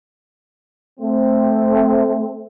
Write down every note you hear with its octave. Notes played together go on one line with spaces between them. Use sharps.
A3 C4